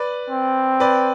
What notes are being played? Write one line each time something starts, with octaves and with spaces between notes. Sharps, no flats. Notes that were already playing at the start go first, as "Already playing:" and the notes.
Already playing: B4 D5
C4
B4 D5